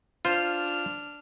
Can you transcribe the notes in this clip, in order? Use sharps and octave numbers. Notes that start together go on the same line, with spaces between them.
D4 F4 C5 F6